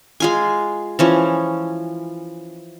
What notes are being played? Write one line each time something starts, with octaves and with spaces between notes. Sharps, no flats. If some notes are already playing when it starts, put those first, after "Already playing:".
G#3 F4 G#5
E3 F3 C#4